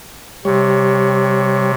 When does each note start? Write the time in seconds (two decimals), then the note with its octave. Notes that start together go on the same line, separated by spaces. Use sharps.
0.45 C3 G3 C#5